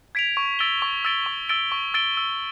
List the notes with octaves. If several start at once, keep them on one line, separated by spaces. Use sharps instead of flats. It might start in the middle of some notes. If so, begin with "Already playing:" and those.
G#6 B6 D7 F7
C#6
E6 A6 D7 G7
C#6
E6 A6 D7 G7
C#6
E6 A6 D7 G7
C#6
E6 A6 D7 G7
E6